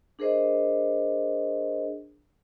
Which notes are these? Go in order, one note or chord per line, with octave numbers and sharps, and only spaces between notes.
D4 G#4 A#4 C5 D#5